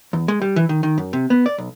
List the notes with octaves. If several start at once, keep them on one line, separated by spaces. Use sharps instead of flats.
E2
G#3
G3
E3
D#3
D#3
F#2
C3
B3
D5
B1